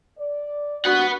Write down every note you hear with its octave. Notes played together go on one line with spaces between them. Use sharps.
D5
G3 A#3 D4 F#4 B4 F#5